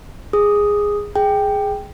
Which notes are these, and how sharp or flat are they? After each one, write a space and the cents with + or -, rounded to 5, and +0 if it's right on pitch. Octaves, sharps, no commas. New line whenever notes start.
G#4 -10 D#6 +0
G#4 +0 G5 +0